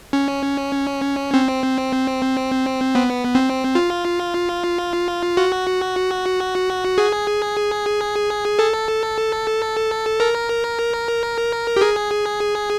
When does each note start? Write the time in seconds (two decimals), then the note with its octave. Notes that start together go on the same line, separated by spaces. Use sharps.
0.13 C#4
1.34 C4
2.95 B3
3.35 C4
3.75 F4
5.37 F#4
6.98 G#4
8.59 A4
10.20 A#4
11.77 G4
11.81 G#4